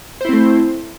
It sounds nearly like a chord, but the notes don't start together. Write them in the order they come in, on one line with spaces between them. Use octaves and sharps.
C5 E4 C4 A3